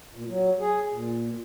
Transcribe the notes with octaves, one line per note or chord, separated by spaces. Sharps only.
A#2
F#3
G#4
A#2